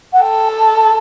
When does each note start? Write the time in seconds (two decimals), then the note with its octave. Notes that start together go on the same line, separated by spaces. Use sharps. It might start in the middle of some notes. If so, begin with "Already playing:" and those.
0.13 F#5
0.21 A4 G5
0.49 A5